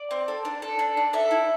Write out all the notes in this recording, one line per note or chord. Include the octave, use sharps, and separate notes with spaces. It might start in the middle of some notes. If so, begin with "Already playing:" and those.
Already playing: D5
C4
A4
D4
A4
D4
D4
A4 E5
E4